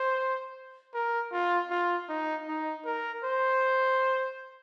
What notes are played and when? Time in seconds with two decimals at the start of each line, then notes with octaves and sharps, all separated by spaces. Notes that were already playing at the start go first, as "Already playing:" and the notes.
Already playing: C5
0.94 A#4
1.32 F4
1.70 F4
2.09 D#4
2.48 D#4
2.85 A#4
3.24 C5